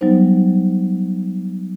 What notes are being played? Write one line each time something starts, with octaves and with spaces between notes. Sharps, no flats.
F#3 G3 B3 D#4 C5